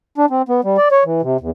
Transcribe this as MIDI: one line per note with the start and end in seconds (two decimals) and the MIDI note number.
0.18 0.26 62
0.30 0.42 60
0.49 0.61 59
0.64 0.77 55
0.78 0.88 74
0.91 1.04 73
1.05 1.22 52
1.22 1.37 48
1.41 1.50 40